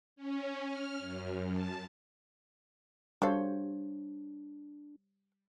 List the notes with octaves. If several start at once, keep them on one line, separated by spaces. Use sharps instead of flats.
C#4
F6
F#2
A5
G3 D4 F#4 A4 C5 C#5 F5